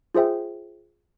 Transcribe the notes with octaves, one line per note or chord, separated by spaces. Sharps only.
F4 G#4 C5 E5 G5